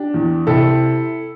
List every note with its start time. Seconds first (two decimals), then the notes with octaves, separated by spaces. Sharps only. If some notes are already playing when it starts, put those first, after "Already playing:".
Already playing: D4 G4
0.14 E2
0.47 C3 E4 A4